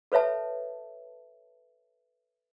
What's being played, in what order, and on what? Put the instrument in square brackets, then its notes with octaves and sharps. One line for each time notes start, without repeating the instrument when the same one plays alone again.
[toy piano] A4 B4 C#5 E5 A5